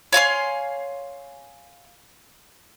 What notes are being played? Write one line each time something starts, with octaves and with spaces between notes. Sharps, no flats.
C#5 F5 G#5 C6